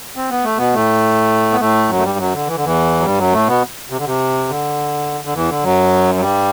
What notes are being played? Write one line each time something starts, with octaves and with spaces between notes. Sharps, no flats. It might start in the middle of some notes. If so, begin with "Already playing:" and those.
C4
B3
A3
B2 B3
A2 A3
B3
A2 A3
F#2 F#3
A3
G2 G3
F#2 F#3
D3
E3
D3
E2 E3
F#3
G2 G3
F#2 F#3
A2 A3
B2 B3
C3
D3
C3
D3
D3
E2 E3
D3
F#2 F#3
F#3
G2 G3